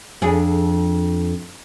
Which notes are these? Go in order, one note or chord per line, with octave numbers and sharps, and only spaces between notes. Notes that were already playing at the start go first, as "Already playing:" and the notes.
F2 D4 G#4